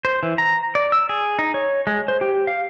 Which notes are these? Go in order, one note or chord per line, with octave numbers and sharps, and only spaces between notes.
C5
E3
A#5
D5
E6
G#4
D#4
C#5
G#3
C5
G4
F5